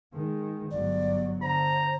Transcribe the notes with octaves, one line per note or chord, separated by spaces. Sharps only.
D#3 G#3
G1 F#3 D5
D3 C5 A#5